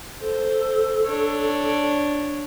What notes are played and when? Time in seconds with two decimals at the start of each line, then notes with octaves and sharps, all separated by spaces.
0.21 A4 C5
1.07 D4 C#5